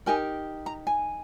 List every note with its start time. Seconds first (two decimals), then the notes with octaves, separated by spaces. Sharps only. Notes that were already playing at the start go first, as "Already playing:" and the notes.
0.06 D#4 G4 A#4 G#5
0.66 A#5
0.87 G#5